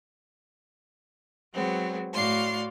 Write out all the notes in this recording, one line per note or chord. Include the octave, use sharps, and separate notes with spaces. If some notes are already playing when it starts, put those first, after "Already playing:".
F#3 G#3 B3 C4
A2 F#4 D5 F5 C6